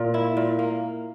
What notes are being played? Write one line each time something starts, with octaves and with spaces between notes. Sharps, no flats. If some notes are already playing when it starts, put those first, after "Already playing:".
Already playing: A#2 A#3
E4
A#2
A#3